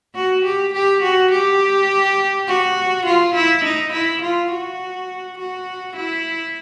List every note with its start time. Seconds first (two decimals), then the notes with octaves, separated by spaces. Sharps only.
0.15 F#4
0.45 G4
0.74 G4
1.03 F#4
1.32 G4
2.48 F#4
3.06 F4
3.35 E4
3.64 D#4
3.93 E4
4.22 F4
4.52 F#4
5.39 F#4
5.96 E4